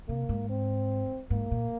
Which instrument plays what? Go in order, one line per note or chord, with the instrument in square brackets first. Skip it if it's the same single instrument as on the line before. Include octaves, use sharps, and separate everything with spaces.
[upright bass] C3 [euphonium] A#3
[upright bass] G#2
[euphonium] C4
[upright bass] G#2 [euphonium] A#3
[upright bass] A#2